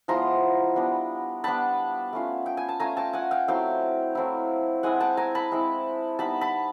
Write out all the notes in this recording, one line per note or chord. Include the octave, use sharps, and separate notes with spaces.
F3 G#3 B3 E4 A#5 C6
G3 B3 D4
G3 B3 D4 A5 B5
A3 C#4 F4
G5
G#5
A5
A3 C#4 F4 G#5 A#5
G5 A5
F#5 G#5
F5 G5
F#3 A3 C4 E4 F5 G5
F#3 A3 C4 E4
G#3 C4 E4 F#5 G#5
G5 A5
G#5 A#5
A5 B5
G#3 C4 E4
G3 B3 D#4 A5 B5
A5 B5